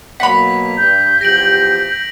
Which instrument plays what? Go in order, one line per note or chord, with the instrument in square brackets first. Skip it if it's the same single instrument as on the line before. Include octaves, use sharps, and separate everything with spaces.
[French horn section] B2 F#3 A#3 [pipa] F#5 B5 [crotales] B6 F7
[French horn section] G2 [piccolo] G6
[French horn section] E2 F3 G4 [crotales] A#6 D7 F#7